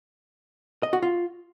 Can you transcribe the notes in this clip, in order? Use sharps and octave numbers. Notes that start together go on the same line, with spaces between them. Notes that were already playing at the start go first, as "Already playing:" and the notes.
D#5
F#4
F4